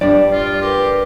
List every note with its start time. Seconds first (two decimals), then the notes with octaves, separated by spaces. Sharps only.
0.01 G2 G3 D5
0.31 F4
0.62 G4 A#4 B4